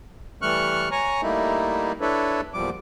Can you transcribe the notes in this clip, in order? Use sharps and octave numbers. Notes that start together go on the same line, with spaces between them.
E3 G3 A3 C#6 F6 F#6
C#5 G#5 A#5 C#6
G3 A3 A#3 D#4 E4
D4 E4 A4 B4 C#5
E2 A#2 F3 G3 D6